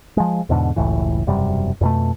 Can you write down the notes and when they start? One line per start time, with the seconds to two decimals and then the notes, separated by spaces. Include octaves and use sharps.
0.17 F3 G#3
0.49 E2 G#2 B2 D3
0.76 F#1 C#2 A2 E3
1.27 E1 F#2 C3 G3
1.81 F2 B2 A3